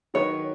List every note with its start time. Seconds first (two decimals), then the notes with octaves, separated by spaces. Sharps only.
0.14 D#3 F#3 D#4 B4 C#5